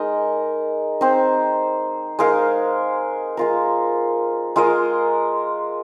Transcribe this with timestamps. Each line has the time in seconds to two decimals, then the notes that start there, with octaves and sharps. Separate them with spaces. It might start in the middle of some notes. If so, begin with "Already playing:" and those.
Already playing: G#3 D#4 A#4 D#5
1.01 C4 D#4 C5
2.19 G#3 D#4 A#4 F5
3.37 G#3 F4 A#4
4.56 G#3 F4 A#4 D#5